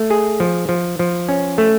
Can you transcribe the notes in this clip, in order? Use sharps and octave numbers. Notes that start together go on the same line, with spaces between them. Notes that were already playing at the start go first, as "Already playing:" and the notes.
Already playing: A3
G#4
F3
F3
F3
C#4
A3